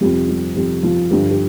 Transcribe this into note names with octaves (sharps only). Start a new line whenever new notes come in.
F2 C3 F3 G3 G4
G3 G4
F2 C3 F3 G3 G4
F3 F4
G2 D3 F3 G3 G4
G4